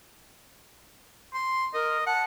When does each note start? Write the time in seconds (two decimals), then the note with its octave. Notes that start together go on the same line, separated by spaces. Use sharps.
1.34 C6
1.74 A#4 D#5
2.06 F#5 A5